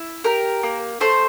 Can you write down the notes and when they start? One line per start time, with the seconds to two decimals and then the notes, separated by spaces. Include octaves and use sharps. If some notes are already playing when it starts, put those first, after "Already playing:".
Already playing: E4
0.24 G4 A#4
0.63 A#3
1.01 A3 C5